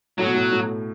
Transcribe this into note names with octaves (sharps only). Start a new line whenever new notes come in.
A2 F#3
B2
A2
A2